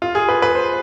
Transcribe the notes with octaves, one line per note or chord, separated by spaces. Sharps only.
F4
G#4
B4
B4
C5